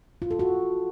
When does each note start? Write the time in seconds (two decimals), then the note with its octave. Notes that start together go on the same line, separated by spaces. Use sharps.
0.22 F4
0.31 A4
0.39 F#4